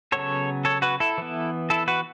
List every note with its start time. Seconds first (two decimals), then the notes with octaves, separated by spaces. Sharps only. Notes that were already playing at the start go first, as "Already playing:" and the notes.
0.12 C#3 F#3 B3 A4 C#5
0.65 A4 C#5
0.82 F#4 B4
1.00 E4 A4
1.18 E3 B3
1.70 E4 A4
1.88 F#4 B4